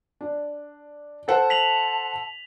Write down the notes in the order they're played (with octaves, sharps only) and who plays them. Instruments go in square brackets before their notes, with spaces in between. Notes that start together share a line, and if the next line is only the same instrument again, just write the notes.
[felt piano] D4
[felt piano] A4 C5 F#5 [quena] A5
[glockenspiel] B6 F7 F#7